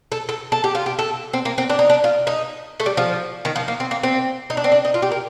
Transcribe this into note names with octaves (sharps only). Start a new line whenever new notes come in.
A4
A4
A4
G4
F4
G4
A4
C4
A#3
C4
D4
D#4
D4
F4
D#4
A3
G3
F3
D#3
F3
A#3
C4
A#3
C4
D#4
D4
C4
D4
D#4
F4
G4
A#4